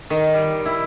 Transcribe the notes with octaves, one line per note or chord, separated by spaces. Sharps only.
D#3
G3
E4